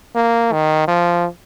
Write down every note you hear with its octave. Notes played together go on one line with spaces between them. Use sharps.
A#3
D#3
F3